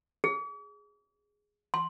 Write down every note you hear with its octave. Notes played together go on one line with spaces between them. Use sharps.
G#4
C6